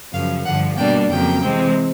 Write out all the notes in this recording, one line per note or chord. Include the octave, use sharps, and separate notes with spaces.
F#2 C#3 F3 F5
G2 D3 F3 F#5
B2 G3 A#3 D4 G5
F2 C#3 F#3 A#3 G5
C3 E3 G#3 C4